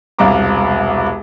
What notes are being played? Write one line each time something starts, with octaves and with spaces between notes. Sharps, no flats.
E1 C2 F5 A#5 D6